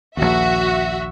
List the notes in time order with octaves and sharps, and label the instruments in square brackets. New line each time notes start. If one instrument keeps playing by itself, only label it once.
[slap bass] A#1 D#2 [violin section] F#4 E5